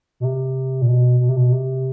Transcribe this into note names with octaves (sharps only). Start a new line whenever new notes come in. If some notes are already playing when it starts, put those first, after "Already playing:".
B2
C3
A#2
B2
B2
C3
B2
C3